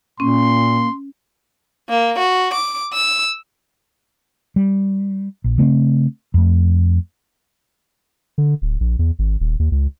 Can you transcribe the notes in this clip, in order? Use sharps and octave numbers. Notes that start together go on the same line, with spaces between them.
A#2 A#3 C#4 C6
A#3
F#4
D6
E6
G3
A#1
C#3 A3 B3 C4
F2 A3
D3
D1
A#1
E2
G#1
D#1
D#2
C#2